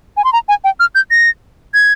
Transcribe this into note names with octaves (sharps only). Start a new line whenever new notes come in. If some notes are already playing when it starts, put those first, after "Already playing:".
G#5
C6
A#5
G#5
G5
F6
G6
A#6
G#6